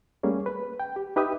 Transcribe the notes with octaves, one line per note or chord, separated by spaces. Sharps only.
G3 A3 A#3 C#4 G#4
B4
G5
G4
D#4 G4 B4 E5 D#6